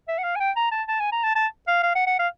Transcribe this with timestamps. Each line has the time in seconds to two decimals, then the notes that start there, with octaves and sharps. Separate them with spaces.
0.08 E5
0.18 F#5
0.24 F5
0.36 G#5
0.40 G5
0.56 A#5
0.71 A5
0.88 A5
1.00 G#5
1.12 A#5
1.23 A5
1.35 A5
1.67 F5
1.83 F5
1.95 F#5
2.07 F#5
2.19 F5